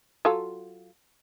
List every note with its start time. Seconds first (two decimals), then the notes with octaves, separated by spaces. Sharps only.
0.25 F#3 F4 A4